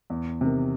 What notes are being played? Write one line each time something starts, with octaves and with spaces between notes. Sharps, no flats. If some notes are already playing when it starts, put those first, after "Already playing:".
E2
C3 D#3